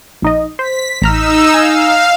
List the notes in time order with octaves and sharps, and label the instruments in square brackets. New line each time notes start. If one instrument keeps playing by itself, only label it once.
[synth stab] A#1 D#4 D#5
[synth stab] C5 [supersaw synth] B6
[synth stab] A1 A#5 F6 [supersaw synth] D#4 E6
[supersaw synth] F5 [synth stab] G#5